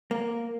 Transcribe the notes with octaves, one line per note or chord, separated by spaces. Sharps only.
A#3